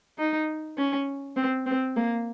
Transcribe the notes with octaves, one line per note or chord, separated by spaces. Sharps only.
D#4
C#4
C4
C4
A#3